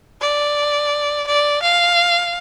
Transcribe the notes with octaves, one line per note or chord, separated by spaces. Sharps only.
D5
D5
F5